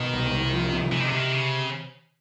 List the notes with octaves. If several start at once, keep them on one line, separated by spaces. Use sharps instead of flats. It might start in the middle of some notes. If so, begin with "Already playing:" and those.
Already playing: B2 D#3
C2
C2
F3
C3
C3 E3
D#3
D3
C3 D#3
C#3